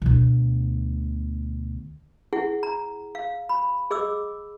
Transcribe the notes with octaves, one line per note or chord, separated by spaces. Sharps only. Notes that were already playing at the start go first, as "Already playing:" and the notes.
D2 B2
E4 G#4 F#5
A#5
F5
B5
G#4 D#5 D6 E6